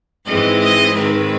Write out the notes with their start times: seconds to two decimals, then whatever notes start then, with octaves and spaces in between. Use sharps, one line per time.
0.25 G#2 E3 G#3 C4 D#5
0.59 D#5
0.93 G#2 D#3 G#3 C4 B4